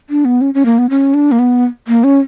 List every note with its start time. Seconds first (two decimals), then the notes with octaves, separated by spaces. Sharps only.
0.10 D4
0.25 B3
0.41 C#4
0.54 C#4
0.65 A#3
0.78 B3
0.90 C#4
1.14 D4
1.32 A#3
1.39 B3
1.88 A#3
2.04 C#4